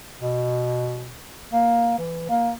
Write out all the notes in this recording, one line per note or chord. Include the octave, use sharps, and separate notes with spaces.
B2
A#3
E3
A#3